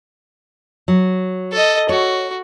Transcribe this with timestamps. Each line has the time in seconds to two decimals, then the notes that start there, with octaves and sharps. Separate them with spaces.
0.88 F#3
1.52 A4 D#5
1.89 F#4 C#5